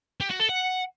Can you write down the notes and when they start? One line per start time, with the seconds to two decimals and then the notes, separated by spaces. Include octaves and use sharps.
0.21 G4
0.30 F#4
0.40 A4
0.49 F#5